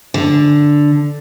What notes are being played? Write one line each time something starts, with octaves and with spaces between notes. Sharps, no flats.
D3